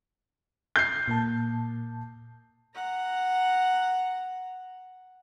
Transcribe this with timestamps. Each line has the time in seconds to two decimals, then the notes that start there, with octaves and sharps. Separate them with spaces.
0.76 G6 C7
1.08 A#2 A#3 A5
2.75 F#5 A#5